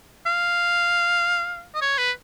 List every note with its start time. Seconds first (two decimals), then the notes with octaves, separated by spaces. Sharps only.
0.26 F5
1.75 D#5
1.81 C#5
1.98 B4